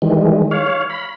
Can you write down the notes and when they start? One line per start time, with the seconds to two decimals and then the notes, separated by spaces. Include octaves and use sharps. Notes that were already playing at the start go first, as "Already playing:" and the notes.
0.02 D#3 E3 G3 G#3
0.51 C#5 F5
0.90 B5